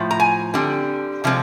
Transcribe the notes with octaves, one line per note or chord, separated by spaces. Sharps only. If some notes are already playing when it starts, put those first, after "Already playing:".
Already playing: A2 F3
A#5
G#5
D3 G3 C4
C3 F3 G#3 C4